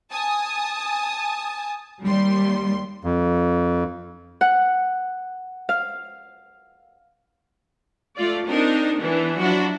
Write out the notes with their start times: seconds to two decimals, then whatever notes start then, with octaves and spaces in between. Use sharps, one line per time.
0.11 G#5 A5 D#6
2.03 D#2 G3 C6
3.04 F2
4.41 F#5
5.69 F5
8.17 A3 F4 D5
8.45 C4 D4 D#4 A#4
8.97 E3 B3 D4
9.38 F3 F#3 D4 E4 F#4